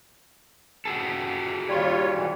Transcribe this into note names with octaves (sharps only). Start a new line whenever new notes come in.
F#4 G#4 A4
D#2 G3 F4 C#5
G#2 B2 E3